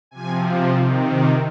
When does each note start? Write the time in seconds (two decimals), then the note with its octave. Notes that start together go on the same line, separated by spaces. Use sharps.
0.11 C3 F3 G#5
0.72 C3 D#3